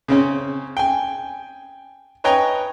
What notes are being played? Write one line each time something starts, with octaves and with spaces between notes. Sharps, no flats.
C#3 C4 C#4
G5 G#5
B4 C#5 D#5 G5 G#5 A#5